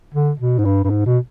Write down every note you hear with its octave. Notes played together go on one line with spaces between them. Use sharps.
D3
B2
G#2
G2
G2
G#2
B2